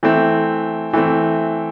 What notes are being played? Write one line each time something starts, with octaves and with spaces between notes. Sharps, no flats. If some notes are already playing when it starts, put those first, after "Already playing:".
E3 A3 C4
E3 A3 C4